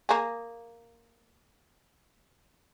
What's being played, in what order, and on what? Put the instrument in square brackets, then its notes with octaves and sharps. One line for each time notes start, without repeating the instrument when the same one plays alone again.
[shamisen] A#3 G#4